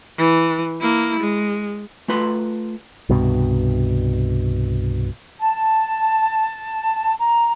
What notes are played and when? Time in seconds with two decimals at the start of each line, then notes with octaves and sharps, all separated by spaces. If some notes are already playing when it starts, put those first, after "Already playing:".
0.18 E3
0.80 A#3 E4
1.20 G#3
2.08 A3 F4 B4 C6
3.09 C2 G2 B2
5.40 A5
7.19 A#5